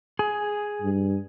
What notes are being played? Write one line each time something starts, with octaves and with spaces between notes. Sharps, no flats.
G#4
G2